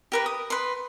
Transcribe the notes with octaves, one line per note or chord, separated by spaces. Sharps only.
G4 A#4 B4
D#6
B4 C6